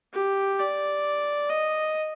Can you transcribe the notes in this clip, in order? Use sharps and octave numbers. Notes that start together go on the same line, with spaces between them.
G4
D5
D#5